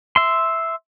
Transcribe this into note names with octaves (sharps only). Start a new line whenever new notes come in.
E5 C6